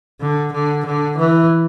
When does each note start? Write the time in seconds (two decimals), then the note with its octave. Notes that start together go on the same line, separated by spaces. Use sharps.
0.21 D3
0.53 D3
0.86 D3
1.18 E3